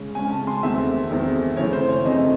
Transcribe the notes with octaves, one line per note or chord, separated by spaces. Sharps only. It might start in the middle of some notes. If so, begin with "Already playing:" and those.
Already playing: C#3 G#3 C#4
C#3 G#3 C#4 G#5
A5
C6
E2 D#3 A3 C4 E5
E2 D#3 A3 C4
F#2 C#3 E3 A3 C4 C#5
C5
C#5
F#2 C#3 E3 A3 C4 D#5